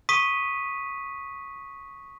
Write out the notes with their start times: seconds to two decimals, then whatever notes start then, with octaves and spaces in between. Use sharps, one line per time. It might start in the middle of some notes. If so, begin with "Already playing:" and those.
0.09 C#6 D#6 B6 D#7